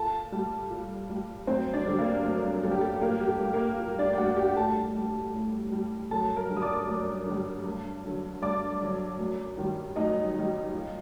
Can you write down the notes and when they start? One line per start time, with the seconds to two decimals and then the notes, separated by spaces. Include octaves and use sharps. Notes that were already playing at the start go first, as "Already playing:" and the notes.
Already playing: A#2 A4 A5
0.32 G3
0.71 A#2
1.10 G3
1.47 F#2 C4 C5
1.73 D4 D5
1.86 D3 G3
1.99 A#3 A#4
2.25 F#2
2.63 D3 G3 A4
2.71 G4
2.81 A4
3.01 A#2 A#3 A#4
3.20 G4
3.27 A4
3.40 G3
3.53 A#3 A#4
3.80 A#2
3.99 D4 D5
4.13 G5
4.18 G3 F#4 F#5
4.37 G4 G5
4.56 A2 A4 A5
4.95 G3
5.34 A2
5.72 G3
6.11 F#2 A4 A5
6.36 A#4 A#5
6.50 D3 G3
6.57 D#6
6.62 D5 D6
6.87 F#2
7.26 D3 G3
7.65 G2
8.04 D3 F#3
8.42 G2 D5 D6
8.81 D3 F#3
9.19 F#2
9.57 D#3 G3
9.96 F#2 D#4 D#5
10.34 D#3 G3
10.73 A#2